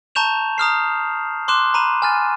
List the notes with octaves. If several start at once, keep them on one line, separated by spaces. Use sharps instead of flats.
A5 A#5 C#6 G6 E7 F7
A#5 D#6 F6 C7
C6 D6 F#6 E7
A#5 B5 D#7 E7
G#5 F6 A6